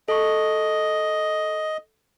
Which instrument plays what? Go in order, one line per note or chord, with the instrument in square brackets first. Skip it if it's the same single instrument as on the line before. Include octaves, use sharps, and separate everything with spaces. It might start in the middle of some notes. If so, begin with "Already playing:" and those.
[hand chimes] A4 C#6 [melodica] D#5